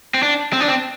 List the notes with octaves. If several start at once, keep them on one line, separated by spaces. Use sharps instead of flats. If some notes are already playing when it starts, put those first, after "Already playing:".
C4
D4
C4
D4
C4